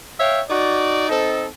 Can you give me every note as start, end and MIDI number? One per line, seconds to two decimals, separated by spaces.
0.20 0.40 73
0.20 0.40 76
0.20 0.40 77
0.20 0.40 79
0.49 1.08 63
0.49 1.08 66
0.49 1.08 74
1.10 1.46 60
1.10 1.46 63
1.10 1.46 69